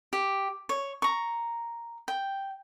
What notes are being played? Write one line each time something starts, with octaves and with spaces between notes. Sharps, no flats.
G4
C#5
A#5 C#6
G5